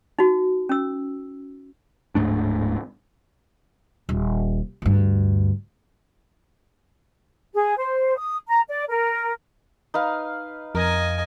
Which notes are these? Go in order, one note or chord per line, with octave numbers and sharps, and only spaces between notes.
D#4 F#4
C#4 E6
D1 G#2 A3 D4
D#1
D2 G2
G#4
C5
D#6
A#5
D5
A#4
D#4 B4 F5
F2 A#4 D#5 G#5